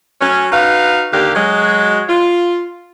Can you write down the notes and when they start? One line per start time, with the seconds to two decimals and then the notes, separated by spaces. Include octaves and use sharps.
0.21 F#3 A3 C#4
0.52 D#4 F#4 B4 F5
1.12 D#2 D3 G4 A#4 F5
1.35 F#3 G#3
2.09 F4